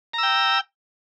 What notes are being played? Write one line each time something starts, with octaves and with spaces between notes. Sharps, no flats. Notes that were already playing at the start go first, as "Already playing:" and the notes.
G5 A#5 E6